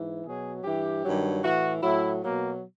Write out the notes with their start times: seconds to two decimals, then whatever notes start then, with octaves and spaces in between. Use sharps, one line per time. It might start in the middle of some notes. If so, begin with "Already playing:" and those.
Already playing: G#2 E3
0.25 B2 F#3 G#4
0.64 G2 E3 G4
1.04 G2 D#3 F#3
1.43 A2 E3 F#4
1.82 A2 F#3 E4
2.22 B2 F#3 A#3